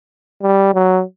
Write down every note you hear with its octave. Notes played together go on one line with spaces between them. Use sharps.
G3
F#3